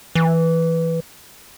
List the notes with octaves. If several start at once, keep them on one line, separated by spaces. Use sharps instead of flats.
E3